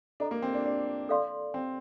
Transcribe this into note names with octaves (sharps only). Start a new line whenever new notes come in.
D4 A4 D#5 A#5
A#3
C4
D4
D4
A4 D5 F5 C6
C4